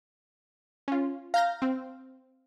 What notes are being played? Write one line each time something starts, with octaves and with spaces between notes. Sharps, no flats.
C#4 F4
F5 A#5 G6 A#6
C4